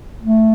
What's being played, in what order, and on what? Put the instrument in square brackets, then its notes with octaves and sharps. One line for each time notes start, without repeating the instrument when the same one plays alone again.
[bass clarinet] A3